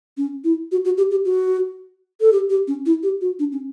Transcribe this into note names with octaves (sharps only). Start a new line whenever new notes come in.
C#4
E4
F#4
F#4
G4
G4
F#4
A4
G4
G4
C#4
E4
G4
F#4
D4
C#4